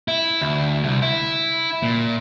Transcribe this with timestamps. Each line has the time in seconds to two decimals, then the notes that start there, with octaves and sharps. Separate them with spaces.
0.08 E4
0.41 D2
0.83 C2
1.02 E4
1.83 A#2